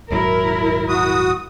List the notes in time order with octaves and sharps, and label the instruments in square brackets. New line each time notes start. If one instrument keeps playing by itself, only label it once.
[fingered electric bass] D#1 G#2 F#3 [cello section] E4 A#4
[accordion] F#4 D#6